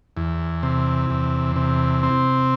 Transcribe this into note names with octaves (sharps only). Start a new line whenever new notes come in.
E2
C3
E2
C3
C4